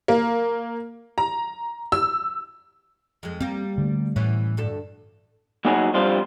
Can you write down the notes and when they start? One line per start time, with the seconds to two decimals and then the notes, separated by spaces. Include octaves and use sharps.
0.08 A#3
1.18 A#5
1.92 E6
3.23 F2 G#3
3.41 G3 A#3 C4
3.78 D3 A3
4.16 A2 E3 B3 C#4
4.57 D2 G2 A4
5.65 F#3 A#3 D#4 F#4 G#4 C#5
5.94 G2 F3 G3 C4 F4